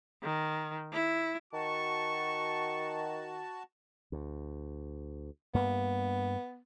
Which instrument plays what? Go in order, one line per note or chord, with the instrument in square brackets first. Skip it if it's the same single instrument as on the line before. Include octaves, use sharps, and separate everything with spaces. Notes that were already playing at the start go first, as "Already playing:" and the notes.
[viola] D#3
E4
[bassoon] D#3 [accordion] F#4 A5 [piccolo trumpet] C#6
[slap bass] D2
[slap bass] G2 A#3 [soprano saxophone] B3